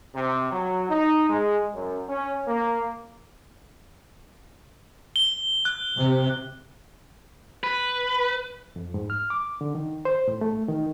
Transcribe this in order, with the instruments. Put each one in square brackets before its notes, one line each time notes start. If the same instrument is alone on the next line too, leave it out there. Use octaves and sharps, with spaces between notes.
[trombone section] C3
F#3
D#4
G#3
F#2
C#4
A#3
[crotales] G7
F#6
[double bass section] C3
[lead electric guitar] B4
[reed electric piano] F2
G#2
F6
D6
D3
D#3
C5
A2
A3
D#3